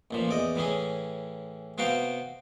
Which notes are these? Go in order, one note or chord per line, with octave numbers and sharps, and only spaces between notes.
A1 A#2 F3
E2 D5 D#5
A2 E3 C#4 G#4
C3 B3 F#4 F5 G5